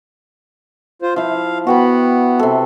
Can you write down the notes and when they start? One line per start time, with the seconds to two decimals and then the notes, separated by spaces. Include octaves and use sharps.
1.02 F4 C5
1.16 F3 E4 F5
1.67 B3 F#4 G5 B5
2.39 C3 A4